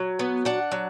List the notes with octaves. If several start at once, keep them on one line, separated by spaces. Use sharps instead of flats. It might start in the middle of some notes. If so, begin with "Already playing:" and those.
Already playing: F#3
B3
D4 F#5
F#3